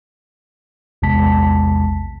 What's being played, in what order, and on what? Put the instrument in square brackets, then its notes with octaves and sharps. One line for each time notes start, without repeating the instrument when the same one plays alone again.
[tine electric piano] A#1 E2 C3 G#3 A5 B6